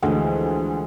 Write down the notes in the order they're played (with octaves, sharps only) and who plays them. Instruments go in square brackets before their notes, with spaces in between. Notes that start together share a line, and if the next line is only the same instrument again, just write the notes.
[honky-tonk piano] D2 [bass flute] E3 [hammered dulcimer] F3 G#3